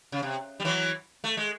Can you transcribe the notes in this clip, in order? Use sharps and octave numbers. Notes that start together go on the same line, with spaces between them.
C#3
C3
G3
E3 F#3
A3
G#3